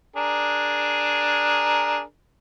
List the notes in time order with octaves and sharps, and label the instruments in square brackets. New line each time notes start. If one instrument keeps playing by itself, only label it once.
[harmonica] D4 G#4 A#4